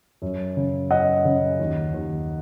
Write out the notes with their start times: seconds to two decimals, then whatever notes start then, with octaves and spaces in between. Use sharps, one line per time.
0.22 F#2
0.57 C#3
0.91 F#2 D#5 F#5
1.25 C#3
1.59 D#2
1.94 D#2